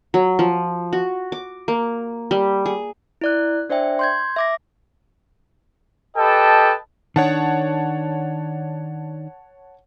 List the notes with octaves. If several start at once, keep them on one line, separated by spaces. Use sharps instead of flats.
F#3
F3
F#4
D6
A#3
G3
G#4
E4 D5 F#6
D4 C5 D5 E5 G5
C6 G6 G#6
E5 D6 A#6
G4 A4 B4 D#5 G5 A5
D#3 D4 C#5 F#5 A5